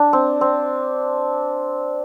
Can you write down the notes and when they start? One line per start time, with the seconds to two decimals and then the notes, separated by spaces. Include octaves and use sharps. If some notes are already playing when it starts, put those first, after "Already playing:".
Already playing: D4
0.13 C4
0.41 C4